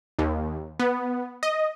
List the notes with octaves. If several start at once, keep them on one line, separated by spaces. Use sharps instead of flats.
D#2
B3
D#5